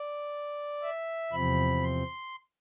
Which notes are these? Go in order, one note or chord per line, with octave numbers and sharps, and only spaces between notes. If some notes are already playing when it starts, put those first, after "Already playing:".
Already playing: D5
E5
E2 C3 F3 C4 B5
C6